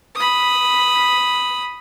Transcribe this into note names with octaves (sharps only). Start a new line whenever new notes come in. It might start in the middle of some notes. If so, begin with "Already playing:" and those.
B5 D#6